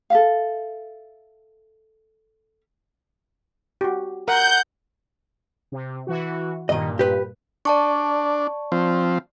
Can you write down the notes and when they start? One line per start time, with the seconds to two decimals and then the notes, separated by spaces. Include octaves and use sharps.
0.10 A4 E5 F5
3.81 F#4 G4
4.28 A#4 F#5 G6
5.72 C3
6.07 E3 F#4
6.69 G2 A#2 D#3 D#5
6.99 G4 B4
7.65 D4 D5 A5 C#6
8.72 F3 C4